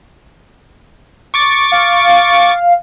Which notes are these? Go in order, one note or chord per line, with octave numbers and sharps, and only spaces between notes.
C#6 D6 A6
F5